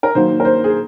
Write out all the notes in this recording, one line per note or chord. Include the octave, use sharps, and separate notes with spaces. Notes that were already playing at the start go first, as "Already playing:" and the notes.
A#4
D#3 F#3 A#3 C5
A#4
C5
G#4